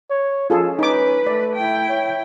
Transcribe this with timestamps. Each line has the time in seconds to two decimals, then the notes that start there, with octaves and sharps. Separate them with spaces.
0.10 C#5
0.50 F3 C#4 F4 G#4 A4
0.79 D#4 B4 D6
1.27 A3 D5
1.56 E4 G5
1.89 C#5